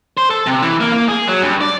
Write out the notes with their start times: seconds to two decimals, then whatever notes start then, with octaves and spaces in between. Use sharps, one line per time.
0.17 C5
0.30 A4
0.47 C3
0.62 E3
0.81 A#3
0.93 A#3
1.08 G#4
1.28 F#3
1.42 G2
1.61 D5